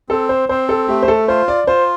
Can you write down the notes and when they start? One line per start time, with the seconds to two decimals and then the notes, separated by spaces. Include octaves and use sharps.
0.09 C4 A4
0.29 C5
0.49 C4 C5
0.69 A4
0.88 A3 G4
1.03 C5
1.08 A4
1.28 F4 C5
1.48 D5
1.67 F4 C5